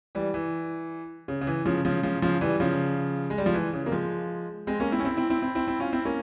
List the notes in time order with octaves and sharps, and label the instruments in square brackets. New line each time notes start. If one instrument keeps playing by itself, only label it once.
[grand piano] E3 G3
E3
C#3
C#3
E3
C#3 F3
C#3 F3
C#3 F3
C#3 F3
E3 G3
C#3 F3
G#3
G3
F3
E3
C#3
A#3
F3 G#3
G#3 C4
A#3 C#4
C4 E4
C#4
C4 E4
C4 E4
C4 E4
C4 E4
C4 E4
C4 E4
C#4 F4
C4 E4
A#3 C#4